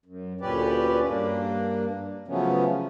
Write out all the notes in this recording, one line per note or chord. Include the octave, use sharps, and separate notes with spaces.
F#2
D2 A#2 C#4 G4 B4 D5
G2 A#3 D4
C#3 F3 F#3 A3 B3 C#4